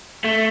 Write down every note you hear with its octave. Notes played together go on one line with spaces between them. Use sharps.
A3